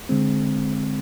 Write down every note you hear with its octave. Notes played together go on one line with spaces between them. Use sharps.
D3 G#3 C4